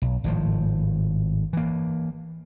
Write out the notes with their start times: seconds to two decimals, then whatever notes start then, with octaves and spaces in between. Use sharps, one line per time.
0.02 B1
0.24 G#1 A2 F3
1.53 E3 A#3